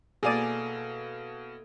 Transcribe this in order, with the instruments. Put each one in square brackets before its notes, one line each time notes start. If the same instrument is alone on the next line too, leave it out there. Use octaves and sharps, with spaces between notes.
[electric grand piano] B2 F5 D#7 [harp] A#3 E4 A4 [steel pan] G#4 D5